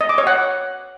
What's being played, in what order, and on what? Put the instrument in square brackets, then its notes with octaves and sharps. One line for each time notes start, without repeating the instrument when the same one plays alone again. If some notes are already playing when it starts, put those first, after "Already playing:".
[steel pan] D#5
D6
C#5
F#5